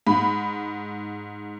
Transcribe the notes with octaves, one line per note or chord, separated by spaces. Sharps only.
G#2 B5